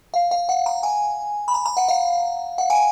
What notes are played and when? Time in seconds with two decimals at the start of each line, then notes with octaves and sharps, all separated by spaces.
0.14 F5
0.31 F5
0.49 F#5
0.66 A#5
0.83 G#5
1.48 B5
1.54 A#5
1.66 A#5
1.77 F#5
1.88 F5
2.58 F#5
2.70 G#5